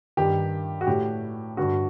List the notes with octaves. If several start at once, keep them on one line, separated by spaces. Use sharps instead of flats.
G2 D#3 G4
F#4
A2 G4
G2 D3 F#4